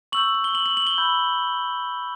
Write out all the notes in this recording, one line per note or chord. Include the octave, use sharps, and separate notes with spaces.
C#6 E6 G6 F#7
F#7
G7
F#7
F#7
F#7
G7
B5 E6 G6